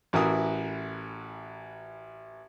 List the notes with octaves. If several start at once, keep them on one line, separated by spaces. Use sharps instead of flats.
A1 E3 F#4 A#4 F#5 D#6